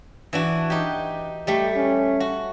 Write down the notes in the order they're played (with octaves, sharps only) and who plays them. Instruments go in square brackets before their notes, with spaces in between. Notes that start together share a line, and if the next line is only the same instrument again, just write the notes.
[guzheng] E3 D4 F#4
D#4 G4
[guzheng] G3 A3 [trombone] G4
[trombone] C#4
[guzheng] F#4